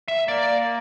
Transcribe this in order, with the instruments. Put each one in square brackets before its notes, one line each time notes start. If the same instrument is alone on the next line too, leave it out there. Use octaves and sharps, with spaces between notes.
[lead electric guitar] E5
[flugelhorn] A#3 [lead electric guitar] D5